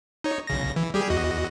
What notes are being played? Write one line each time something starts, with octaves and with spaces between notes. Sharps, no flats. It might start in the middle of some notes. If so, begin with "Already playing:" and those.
D#4 C#5
B1 C#3 A#6
E3
G3 G4 G#4
E2 F#4 D#5